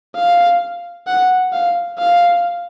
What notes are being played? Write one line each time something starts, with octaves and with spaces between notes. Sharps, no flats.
F5
F#5
F5
F5